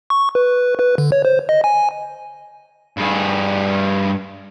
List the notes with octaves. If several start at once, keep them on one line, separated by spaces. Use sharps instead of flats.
C#6
B4
B4
D3
C#5
C5
D#5
G#5
G2 G#4